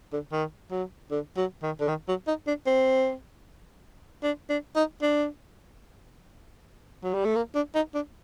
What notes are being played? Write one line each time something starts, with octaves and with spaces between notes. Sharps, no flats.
D3
D#3
F#3
D3
F#3
D#3
D3
D#3
F#3
D#4
D4
C4
D4
D4
D#4
D4
F#3
G3
A3
A#3
D4
D#4
D4